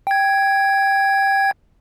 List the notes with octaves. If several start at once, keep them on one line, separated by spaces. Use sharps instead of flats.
G5 G#6